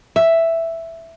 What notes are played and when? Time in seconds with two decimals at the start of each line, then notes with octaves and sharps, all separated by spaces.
0.16 E5